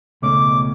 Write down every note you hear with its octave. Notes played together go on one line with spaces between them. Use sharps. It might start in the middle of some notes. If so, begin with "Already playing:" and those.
C#2 B2 A3 C#4 D6